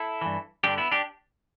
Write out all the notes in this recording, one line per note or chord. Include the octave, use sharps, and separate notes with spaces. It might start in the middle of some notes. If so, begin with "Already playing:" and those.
Already playing: E4 A4
G2 E3
G2 D3 D4 G4
B3 E4
D4 G4